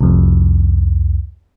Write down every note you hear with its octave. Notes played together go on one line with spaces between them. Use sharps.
C2 F2